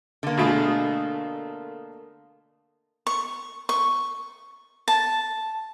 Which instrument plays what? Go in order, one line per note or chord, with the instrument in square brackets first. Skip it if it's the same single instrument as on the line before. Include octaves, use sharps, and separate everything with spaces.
[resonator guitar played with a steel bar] D3 A#3
[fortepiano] B2 A3 G#4
[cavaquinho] C#6
C#6
A5